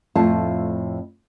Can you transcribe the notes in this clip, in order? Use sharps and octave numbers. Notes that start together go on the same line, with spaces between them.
F2 A2 A3 F4 A5